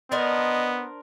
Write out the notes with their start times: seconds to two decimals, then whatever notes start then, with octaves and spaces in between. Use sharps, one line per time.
0.12 B3 D4 A#4 C5 D#5